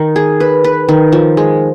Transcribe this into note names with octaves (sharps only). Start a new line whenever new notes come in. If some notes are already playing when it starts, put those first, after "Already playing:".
Already playing: D#3 D#4
G#4
B4
B4
D#3
F3
G#3